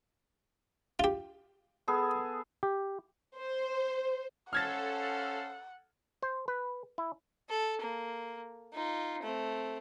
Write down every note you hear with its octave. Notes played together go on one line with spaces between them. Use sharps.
F4 G4
B3 G#4 A4
G4
C5
C#4 A4 C5 F5 F#5 F6 G#6 A6
C5
B4
E4
A4
A#3
D#4 F4
A3 C4